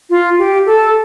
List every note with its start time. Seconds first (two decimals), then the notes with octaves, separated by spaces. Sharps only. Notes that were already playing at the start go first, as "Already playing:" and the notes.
0.10 F4
0.39 G4
0.66 A4